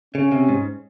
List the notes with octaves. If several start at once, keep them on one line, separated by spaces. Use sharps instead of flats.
C#3 C#4
C3
G#2